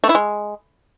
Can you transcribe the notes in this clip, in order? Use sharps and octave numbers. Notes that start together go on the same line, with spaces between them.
A3
E4
G#3